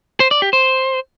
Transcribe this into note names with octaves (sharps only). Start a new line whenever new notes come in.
C5
D5
G4
C5